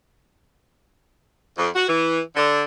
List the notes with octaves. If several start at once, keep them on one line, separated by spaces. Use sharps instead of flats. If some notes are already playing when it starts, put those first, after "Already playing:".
F2
F#4
E3
D3